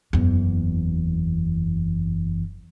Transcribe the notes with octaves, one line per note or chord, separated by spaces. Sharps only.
F#1 E2